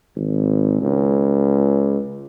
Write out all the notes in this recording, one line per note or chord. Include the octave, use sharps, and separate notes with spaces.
G#1
C#2